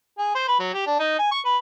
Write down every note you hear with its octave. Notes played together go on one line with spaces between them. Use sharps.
G#4
C5
B4
F#3
G4
D4
D#4
G#5
C#6
B4